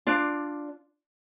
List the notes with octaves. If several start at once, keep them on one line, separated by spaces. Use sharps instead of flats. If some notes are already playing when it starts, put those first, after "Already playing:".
D4 F4 D5